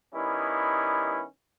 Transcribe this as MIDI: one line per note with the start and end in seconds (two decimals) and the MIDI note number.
0.14 1.23 51
0.14 1.23 55
0.14 1.23 59
0.14 1.23 61
0.14 1.23 64